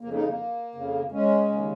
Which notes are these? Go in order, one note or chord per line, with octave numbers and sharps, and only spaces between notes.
F2 C#3 A#3
A#3 D#4
A#3
F2 C#3
G#3 C#4
D#2 C#3